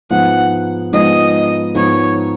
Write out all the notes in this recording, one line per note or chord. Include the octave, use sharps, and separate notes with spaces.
G#2 F3 G#3 B3 F#5
G#2 F3 G#3 B3 D#5
G#2 F3 G#3 B3 C#5